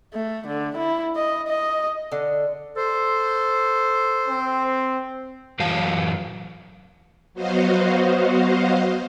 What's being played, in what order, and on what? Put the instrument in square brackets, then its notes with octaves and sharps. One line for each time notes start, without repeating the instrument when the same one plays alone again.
[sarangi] A3
D3
E4
D#5
D#5
[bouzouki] D3
[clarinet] A4 [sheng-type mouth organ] C5
[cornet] C4
[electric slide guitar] F#2 E3 F#3 F#4 F5 A5
[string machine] F#3 B3 F#4 C5 D#5 F5